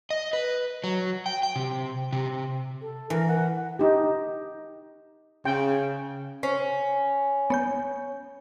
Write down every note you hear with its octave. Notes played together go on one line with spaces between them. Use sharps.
D#5
B4
F#3
G5
G5
C3
C3
A4
E3 A#4
F#5
D#4 G4
C#3 G5
C#4 C5
B3 C#5 G6